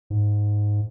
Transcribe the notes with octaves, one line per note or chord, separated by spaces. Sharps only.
G#2